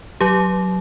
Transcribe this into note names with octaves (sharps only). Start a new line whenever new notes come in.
F#3 G4